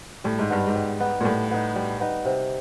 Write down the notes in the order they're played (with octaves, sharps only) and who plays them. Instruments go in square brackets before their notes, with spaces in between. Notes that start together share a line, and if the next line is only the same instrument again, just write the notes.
[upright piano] A2 [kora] G3
[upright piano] G#2
[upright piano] G2 [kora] B3 D#4
[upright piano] G#2
[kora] G3
B3 D#4
[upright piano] A#2
[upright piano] A2 [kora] G3
[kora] B3 D#4
G3
B3 D#4
C3